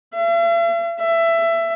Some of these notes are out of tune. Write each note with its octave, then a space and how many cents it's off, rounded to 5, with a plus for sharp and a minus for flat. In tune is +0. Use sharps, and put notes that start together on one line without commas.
E5 +45
E5 +20